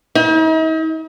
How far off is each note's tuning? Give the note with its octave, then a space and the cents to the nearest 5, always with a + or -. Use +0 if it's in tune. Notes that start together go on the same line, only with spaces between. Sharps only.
D#4 +45